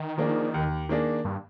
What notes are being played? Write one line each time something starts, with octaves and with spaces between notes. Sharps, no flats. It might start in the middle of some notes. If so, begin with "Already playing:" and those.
Already playing: D#3
F3 A#3 D4 G#4
D#2
D#3 A#3 D4 G#4
G2